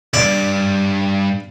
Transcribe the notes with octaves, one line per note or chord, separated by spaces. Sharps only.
C2 G2 D5